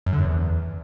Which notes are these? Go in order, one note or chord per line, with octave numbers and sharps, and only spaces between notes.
F#2
D3
F#2
E2